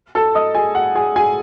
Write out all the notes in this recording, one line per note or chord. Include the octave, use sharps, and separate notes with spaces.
A4 A5
D#5 D#6
G#4 G#5
F#5
G#4 G#5
G#4 G#5